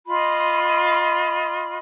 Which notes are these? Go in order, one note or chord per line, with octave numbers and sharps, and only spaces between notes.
F4 D#5 B5 C6